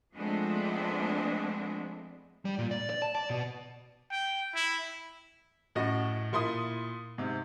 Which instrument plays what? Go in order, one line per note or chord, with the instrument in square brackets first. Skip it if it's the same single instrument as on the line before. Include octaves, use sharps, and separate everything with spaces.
[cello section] F3 G#3 A3 B3 C4 D4
[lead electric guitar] G3
A#2
D5
D5
A5
D5
B2
[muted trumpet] G5
E4
[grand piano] F#2 A2 F#4 D#5
A#2 E4 C6 D#6
G#2 C3